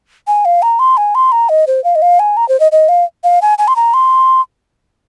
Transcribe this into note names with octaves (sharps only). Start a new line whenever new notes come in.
G#5
F5
A#5
C6
G#5
C6
A#5
D#5
C5
F5
D#5
F5
G#5
A#5
C5
D#5
D#5
F5
F5
G#5
G#5
C6
A#5
C6